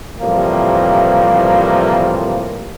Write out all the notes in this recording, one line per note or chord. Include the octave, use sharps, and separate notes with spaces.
A2 C3 E3 F3 G3 A#3